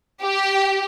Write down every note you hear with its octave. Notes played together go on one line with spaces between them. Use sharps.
G4